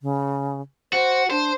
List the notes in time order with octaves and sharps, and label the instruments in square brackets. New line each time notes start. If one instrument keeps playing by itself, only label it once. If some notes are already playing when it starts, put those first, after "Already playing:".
[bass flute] C#3
[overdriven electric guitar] F#4 [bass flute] C5
[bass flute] D4 [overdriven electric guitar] C5